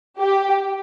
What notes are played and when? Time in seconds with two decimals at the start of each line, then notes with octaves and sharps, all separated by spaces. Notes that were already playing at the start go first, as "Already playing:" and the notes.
0.18 G4